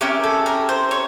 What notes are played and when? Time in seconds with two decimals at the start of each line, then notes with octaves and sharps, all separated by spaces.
0.01 C#4 E4 G4 A#4
0.24 A4
0.46 A#4
0.69 C5
0.91 C#5